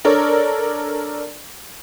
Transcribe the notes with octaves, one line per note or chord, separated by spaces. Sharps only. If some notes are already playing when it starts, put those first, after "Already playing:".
D4 A4 A#4 C#5 D5